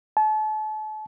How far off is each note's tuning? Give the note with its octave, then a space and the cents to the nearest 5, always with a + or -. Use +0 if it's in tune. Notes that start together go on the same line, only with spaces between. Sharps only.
A5 -35